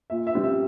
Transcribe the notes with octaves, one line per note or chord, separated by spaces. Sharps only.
A#2 E5
E5
G3 C4
E5